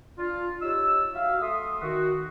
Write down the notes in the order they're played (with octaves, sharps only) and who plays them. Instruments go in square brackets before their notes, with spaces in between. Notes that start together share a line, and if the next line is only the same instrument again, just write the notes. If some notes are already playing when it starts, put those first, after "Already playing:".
[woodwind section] D4 F4
D#4 G4 C#5 E6
F#4 E5 F5
A3 E5 C6 D#6
D#3 F#4